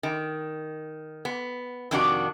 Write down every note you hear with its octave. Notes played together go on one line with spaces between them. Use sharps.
D#3
B3
F2 C3 D#3 D4 F#4